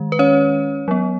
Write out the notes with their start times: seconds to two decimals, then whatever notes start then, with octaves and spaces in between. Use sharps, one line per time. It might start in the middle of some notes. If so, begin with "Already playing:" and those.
Already playing: D#3 G#3
0.12 B4
0.19 C#4 C#5
0.88 F#3 B3